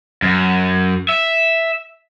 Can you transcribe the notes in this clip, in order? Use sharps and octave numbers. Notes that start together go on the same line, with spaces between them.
F#2
E5